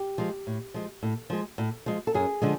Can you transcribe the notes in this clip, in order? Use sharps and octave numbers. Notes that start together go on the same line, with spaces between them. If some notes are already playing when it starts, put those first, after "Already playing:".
Already playing: G4
F3 G#3
A2
F3 G#3
A2
F3 G#3
A2
F3 G#3
A4
F#2 G#4
D3 F3 G#3